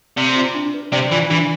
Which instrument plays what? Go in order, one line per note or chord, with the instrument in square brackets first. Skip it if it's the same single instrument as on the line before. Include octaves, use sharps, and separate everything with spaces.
[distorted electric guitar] C3 [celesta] D5
[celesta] F4
D4
B4
[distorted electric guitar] C3 [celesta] D5
[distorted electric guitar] E3 [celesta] F4
[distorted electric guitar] E3 [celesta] D4